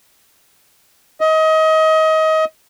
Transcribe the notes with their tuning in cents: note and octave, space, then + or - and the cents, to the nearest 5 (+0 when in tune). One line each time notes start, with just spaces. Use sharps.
D#5 +25